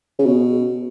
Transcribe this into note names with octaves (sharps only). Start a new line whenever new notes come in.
C#3
B2